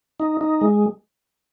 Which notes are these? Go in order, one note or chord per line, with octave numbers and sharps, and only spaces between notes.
D#4
D#4
G#3